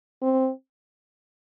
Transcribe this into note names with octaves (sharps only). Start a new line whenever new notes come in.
C4